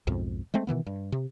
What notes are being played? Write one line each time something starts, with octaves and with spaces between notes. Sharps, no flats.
B1 F2 G#2
G#3 A3 C4
B2 D#3 E3 B3
G2
C3